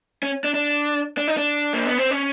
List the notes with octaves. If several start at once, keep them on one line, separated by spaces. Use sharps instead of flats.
C#4
D4
D4
D4
D#4
D4
A#3
B3
C4
C#4